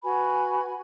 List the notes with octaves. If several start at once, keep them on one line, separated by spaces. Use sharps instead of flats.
F#4 B4 G#5 B5